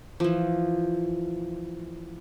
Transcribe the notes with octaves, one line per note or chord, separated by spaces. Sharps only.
E3 F3